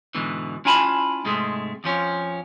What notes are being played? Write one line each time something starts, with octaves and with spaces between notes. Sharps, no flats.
G#2 B2 D3 E3
C#4 E4 F4 G#5 A5 B5
G#2 C3 G#3 A3
F2 F3 C#4